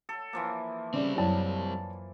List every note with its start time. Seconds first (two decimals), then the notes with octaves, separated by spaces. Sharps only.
0.09 A4
0.33 E3 F3 A#3
0.94 C#3 G3 C4 D5
1.17 F#2 F#3 E4 C#5 D5 A5